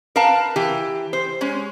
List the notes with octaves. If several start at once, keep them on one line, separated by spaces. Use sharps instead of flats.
A#4 B4 F5 A5
E3 G4
C5
G#3 C#4